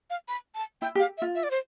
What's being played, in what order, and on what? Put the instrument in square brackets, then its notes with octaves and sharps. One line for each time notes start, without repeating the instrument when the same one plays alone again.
[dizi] F5
B5
A5
[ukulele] E4 [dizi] G5
[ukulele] G4
[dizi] F5
E5
[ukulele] F4
[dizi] E5
D5
C5